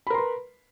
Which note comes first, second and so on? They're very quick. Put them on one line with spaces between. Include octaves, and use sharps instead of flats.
B5 A#4 C6 B4